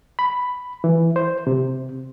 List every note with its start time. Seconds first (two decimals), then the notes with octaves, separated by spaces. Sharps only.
0.19 B5
0.84 E3
1.16 C5
1.47 C3